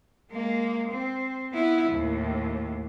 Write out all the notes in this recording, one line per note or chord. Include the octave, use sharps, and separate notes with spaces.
G#3 A#3
C4
B3 E4
D#2 A2